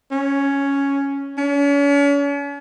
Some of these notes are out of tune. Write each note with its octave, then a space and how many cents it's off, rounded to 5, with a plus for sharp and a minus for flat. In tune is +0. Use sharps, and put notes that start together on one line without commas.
C#4 +5
C#4 +40